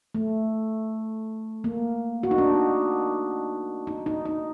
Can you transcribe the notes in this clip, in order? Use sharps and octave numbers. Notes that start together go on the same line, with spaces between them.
A3
A#3
F#4
D#4
D4
D#4
D#4
D#4